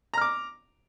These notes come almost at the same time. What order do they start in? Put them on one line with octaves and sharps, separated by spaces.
A#5 F6 D6